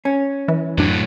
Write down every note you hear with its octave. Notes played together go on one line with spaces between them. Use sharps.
C#4
E3
F#2 A2 F#3 D4